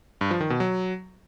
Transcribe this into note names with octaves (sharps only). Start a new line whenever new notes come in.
G2
F3
D#3
B2
F#3